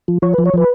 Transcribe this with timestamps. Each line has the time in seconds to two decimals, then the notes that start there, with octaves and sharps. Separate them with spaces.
0.08 F3
0.22 F3 C#5
0.34 F3 B4
0.46 C#5
0.54 F3 B4